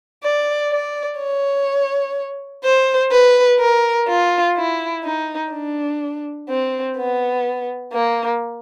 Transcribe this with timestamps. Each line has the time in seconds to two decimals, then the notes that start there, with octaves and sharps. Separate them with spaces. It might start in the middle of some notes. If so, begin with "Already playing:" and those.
0.23 D5
0.71 D5
1.19 C#5
2.63 C5
3.11 B4
3.59 A#4
4.08 F4
4.57 E4
5.04 D#4
5.52 D4
6.49 C4
6.97 B3
7.93 A#3